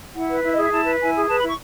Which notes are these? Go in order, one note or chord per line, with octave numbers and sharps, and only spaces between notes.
E4 F#5
B4
E4 E5
D#5
G#4
E5
E4 A5
B4
E4 G#5
G#4
B4 A5
B5
E4 C#6